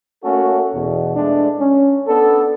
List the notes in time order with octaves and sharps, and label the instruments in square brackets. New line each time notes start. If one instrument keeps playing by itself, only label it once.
[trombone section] A3 A#3 C#4 F#4 A4
E2 B2
G#3 A3 D4
C#4
B3 D4 A4